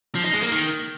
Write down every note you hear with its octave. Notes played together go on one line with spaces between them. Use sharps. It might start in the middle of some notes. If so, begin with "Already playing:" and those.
F3
D#4
G#3
A#3
D#3